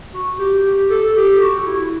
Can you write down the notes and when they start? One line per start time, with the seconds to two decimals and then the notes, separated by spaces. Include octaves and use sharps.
0.15 F#4
0.39 G4
0.66 G4
0.90 A4
1.16 G4
1.41 F#4
1.58 F#4
1.67 E4